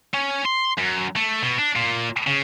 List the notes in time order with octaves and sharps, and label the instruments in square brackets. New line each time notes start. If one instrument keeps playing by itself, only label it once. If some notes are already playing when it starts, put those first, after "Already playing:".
[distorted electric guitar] C#4
C6
F#2
A3
B2
D4
A#2
C#3